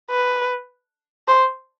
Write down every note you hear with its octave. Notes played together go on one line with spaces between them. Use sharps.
B4
C5